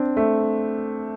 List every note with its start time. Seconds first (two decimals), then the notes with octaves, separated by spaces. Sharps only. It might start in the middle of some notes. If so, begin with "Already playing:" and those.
Already playing: C4 D4
0.17 A3